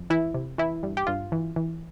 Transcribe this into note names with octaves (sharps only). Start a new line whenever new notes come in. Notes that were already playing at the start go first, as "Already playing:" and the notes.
Already playing: F2
E3 E4
C3
E3 E4
G2
G4
G2 F4
E3
E3